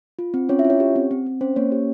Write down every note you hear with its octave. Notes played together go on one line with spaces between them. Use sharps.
F4
C4
C#4 F4 C#5
E4 E5
F4
C#4 C#5
G4
C4
C4
C4
C#4 C5
A#3 C#4 C#5
G4